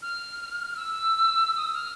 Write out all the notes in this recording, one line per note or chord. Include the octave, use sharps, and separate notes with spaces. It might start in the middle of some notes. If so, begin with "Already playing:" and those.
F6
E6
E6
D#6
E6
F6